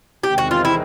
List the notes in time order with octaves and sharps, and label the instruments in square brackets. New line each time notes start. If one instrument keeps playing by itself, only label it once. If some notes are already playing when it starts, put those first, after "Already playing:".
[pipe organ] E2 C3 D#3 G#3 C4 [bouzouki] G4
[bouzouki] F#4
F4
E4